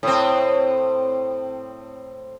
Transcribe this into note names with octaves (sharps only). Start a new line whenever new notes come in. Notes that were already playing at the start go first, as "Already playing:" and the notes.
A2 C4